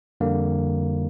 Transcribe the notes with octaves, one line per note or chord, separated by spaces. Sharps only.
F2 D3 G3 A#3